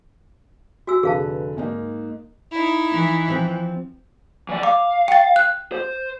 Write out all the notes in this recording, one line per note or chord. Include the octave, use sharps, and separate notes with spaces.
F#4 G#5 E6
F1 D3 G#4 B4 F5 A5
G#2 A#3 D#4
D#4 E4
E3
F3 C4
E3 D5
F5 D6
G5 A6
F#6
C5